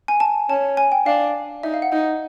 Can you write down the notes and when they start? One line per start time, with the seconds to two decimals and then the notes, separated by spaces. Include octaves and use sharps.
0.08 G#5
0.20 A5
0.49 C#4 A5
0.77 G#5
0.92 G5
1.06 D4 F5
1.63 D#4 E5
1.74 F5
1.82 F#5
1.92 D#4